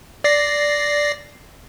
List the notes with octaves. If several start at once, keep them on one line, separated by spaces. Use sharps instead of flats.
D5 A#6 C7